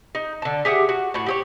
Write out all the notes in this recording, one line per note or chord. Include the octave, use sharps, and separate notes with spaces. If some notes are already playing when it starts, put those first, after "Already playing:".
D#4
D3 A5
G4 G#4 E5 F#5
F#4
A2 F#4
G4 G#4 C#5